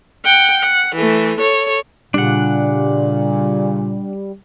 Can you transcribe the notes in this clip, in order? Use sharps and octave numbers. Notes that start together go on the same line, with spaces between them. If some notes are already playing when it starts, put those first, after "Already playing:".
F#5 G5
F#5
E3 A3
A4 C#5
A#2 C#3 G3 D4 F#5